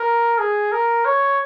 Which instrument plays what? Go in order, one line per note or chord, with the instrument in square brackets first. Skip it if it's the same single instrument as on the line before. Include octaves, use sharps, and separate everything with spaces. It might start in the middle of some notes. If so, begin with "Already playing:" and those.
Already playing: [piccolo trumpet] A#4
G#4
A#4
C#5